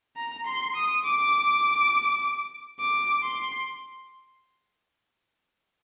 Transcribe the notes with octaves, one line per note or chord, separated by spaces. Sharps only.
A#5
C6
D#6
D6
D6
C6